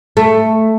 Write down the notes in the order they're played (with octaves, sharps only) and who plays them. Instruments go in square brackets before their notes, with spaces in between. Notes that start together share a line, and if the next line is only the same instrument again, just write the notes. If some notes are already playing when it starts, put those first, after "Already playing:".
[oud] A3